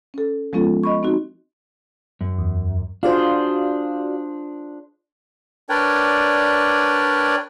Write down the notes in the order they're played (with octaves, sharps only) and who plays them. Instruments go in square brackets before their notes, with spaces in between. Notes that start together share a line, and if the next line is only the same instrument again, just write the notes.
[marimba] C#4 A4
F3 G#3 B3 C#4 F4 A4
D#5 B5 C#6
C4 D#4 F#4
[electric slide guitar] F#2
[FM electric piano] E2
[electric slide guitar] D4 [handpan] F4 G#4 C5 [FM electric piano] F#4 D5 F5
[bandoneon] D4 A#4 B4 C#5 D5 G5